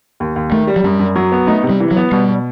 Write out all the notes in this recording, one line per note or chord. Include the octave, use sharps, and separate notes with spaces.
D#2
D#2
D#3 A3
G3
F#3
F#2 G3
F#2
F#3
B3
A3 D#4
C3
G3
E3
F#3
B3
B2 G3
B2